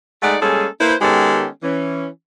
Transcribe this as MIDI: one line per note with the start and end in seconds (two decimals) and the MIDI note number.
0.23 0.38 56
0.23 0.38 57
0.23 0.38 63
0.23 0.38 74
0.23 0.38 78
0.42 0.67 55
0.42 0.67 56
0.42 0.67 58
0.42 0.67 61
0.42 0.67 68
0.42 0.67 69
0.81 0.96 58
0.81 0.96 64
0.81 0.96 71
0.81 0.96 72
1.02 1.47 51
1.02 1.47 56
1.02 1.47 59
1.02 1.47 61
1.02 1.47 67
1.02 1.47 69
1.63 2.07 52
1.63 2.07 61